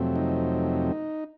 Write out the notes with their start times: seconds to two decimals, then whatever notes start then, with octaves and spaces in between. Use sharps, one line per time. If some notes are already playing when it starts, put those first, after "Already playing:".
Already playing: F2 C3 F#3 A3 C4
0.16 D#4